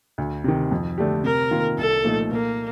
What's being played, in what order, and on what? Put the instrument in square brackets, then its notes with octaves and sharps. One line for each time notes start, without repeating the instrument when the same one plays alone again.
[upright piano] D2
C3 D#3
F2
D3 A3 D4 G4
[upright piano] C3 [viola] A#4
[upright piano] D#3 A#3 F4
[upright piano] C2 [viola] A4
[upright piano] A#2 F3 A3 D#4
[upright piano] A#2 [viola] A#3